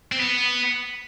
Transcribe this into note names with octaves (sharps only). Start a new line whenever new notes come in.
C4
B3